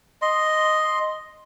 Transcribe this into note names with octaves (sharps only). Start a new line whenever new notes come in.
D#5 C6